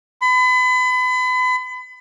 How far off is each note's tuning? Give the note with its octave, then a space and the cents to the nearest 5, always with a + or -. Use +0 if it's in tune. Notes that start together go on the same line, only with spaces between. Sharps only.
B5 +35